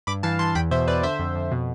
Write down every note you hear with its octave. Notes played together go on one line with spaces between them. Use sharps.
G2 B5 D6
E3 F5 A5
E3 A5 C6
E2 G5 B5
B2 C5 E5
E2 B4 D5
D3 C5 E5
F2
F2
B2